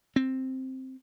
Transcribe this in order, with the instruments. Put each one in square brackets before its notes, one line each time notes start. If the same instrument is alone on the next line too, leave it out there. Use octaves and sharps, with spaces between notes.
[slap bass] C4